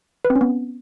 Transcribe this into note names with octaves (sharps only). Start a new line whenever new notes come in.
B4
C4
C#4
B3